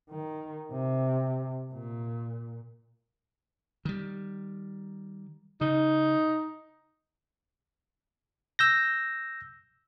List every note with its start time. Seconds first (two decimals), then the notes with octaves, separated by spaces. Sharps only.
0.10 D#3
0.72 C3
1.73 A#2
3.85 D#3 G3
5.61 C#3 D#4
8.59 E6 G6 A#6